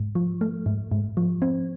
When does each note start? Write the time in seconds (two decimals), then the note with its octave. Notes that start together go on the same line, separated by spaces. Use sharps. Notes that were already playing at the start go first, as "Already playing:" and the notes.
Already playing: G#2
0.15 F3
0.41 A3
0.66 G#2
0.92 G#2
1.17 F3
1.42 C4